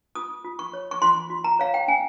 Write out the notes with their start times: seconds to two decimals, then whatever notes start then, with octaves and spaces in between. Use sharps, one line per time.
0.15 F4 D#6
0.44 F4
0.59 C#6
0.73 C#5
0.91 C#6
1.02 F4 C6
1.30 F4
1.44 A#5
1.59 C#5 F5
1.74 G5
1.88 C#4 G#5